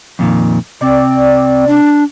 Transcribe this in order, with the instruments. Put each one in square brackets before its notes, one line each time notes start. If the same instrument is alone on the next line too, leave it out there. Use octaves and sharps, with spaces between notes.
[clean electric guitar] F2 A#2 D#3
[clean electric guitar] C3 [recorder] C4 [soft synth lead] D5
[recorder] D4